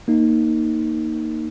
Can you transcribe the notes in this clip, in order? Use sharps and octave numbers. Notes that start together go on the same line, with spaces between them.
A#3 D#4